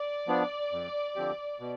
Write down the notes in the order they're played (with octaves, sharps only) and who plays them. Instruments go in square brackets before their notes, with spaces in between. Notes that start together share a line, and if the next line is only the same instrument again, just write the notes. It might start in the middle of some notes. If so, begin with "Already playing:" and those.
Already playing: [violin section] D5
[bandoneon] F3 B3 D4
F2
D3 F3 C4 G4
B2